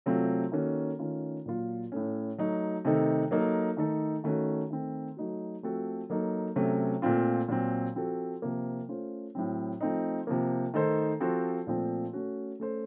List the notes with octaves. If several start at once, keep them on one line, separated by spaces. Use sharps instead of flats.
C3 F#3 A3 C4 F4
D#3 A#3 C#4 F#4 A4
D#3 A3 C#4 F4
A#2 F#3 A#3 F4
A2 A3 C#4
F#3 A3 D#4 F#4
C3 D#3 A3 D#4 A4
F#3 A#3 D#4 A4
D#3 A3 D#4 A4
D#3 A3 C#4 F#4
D#3 A3 C4
F#3 A3 D#4 F#4
F3 A3 C4 F#4 A4
F#3 A#3 D#4 A4
C3 F#3 A3 C#4
A#2 A3 C4 F4
A#2 F#3 C4
F3 C4 F#4 A4
C3 F3 A#3
A3 C#4 F4 C5
A2 F#3 C4
F3 A3 C4 D#4
C3 F3 A#3
D#3 A3 D#4 A4 C5
F3 C4 F#4 A4 C5
A#2 F3 A3 C4
A3 C#4 F#4
A3 C#4 A4 C5